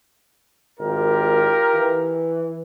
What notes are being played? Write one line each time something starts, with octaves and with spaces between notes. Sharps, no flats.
G#1 F4 G4 A#4
E3